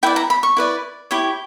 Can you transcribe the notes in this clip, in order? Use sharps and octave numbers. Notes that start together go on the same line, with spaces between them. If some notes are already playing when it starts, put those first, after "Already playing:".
E4 B4 D5 G5
A#5
B5
C#6
E4 B4 D5
E4 G4 C#5